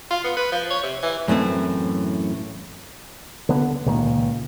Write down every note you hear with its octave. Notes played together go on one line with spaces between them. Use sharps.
F4
B3
B4
F3
C#5
C3
E3
F#2 A2 E3 C4
D3 B3
C#2 A#2 D#3